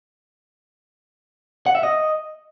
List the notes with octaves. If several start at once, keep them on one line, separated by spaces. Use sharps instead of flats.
F#5
E5
D#5